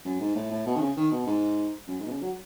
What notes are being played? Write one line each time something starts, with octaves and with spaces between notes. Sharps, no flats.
F#2
G#2
A2
A2
B2
D#3
C#3
D#3
B2
G#2
F#2
G#2
B2
C#3
F#3